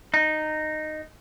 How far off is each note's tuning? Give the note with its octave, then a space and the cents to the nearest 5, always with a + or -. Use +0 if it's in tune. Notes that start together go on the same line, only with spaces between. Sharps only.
D#4 -10